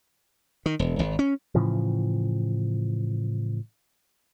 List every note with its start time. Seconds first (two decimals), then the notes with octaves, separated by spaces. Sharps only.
0.66 D#3
0.79 E1
0.99 G#1
1.19 C#4
1.55 A2 C#3 E3 F3